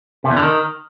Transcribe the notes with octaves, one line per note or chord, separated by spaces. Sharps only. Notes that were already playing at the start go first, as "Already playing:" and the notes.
C3
E2
D3
D#3